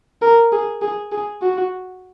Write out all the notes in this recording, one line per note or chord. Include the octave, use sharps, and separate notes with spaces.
A#4
G#4
G#4
G#4
F#4